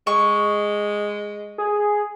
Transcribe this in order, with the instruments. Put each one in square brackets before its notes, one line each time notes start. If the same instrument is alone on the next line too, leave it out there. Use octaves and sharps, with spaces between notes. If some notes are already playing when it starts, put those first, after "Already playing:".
[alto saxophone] G#3 [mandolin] C#6
[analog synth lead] G#4